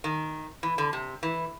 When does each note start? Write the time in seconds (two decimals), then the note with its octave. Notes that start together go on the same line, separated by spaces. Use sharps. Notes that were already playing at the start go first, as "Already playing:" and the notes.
0.04 D#3
0.63 E3
0.78 D3
0.93 C3
1.23 E3